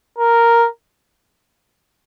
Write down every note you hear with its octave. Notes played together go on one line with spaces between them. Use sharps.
A#4